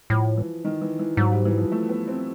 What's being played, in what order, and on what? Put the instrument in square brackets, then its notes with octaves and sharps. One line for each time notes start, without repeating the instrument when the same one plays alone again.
[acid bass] A2 [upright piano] F3
[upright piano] E3
D#3
E3
E3
[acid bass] G#2 [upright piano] F#3
[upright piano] G3
E3
F3
A3
B3
C4